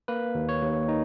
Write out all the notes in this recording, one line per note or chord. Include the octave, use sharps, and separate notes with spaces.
A#3 B4
D#2
C#5
D#2
D#3 D#4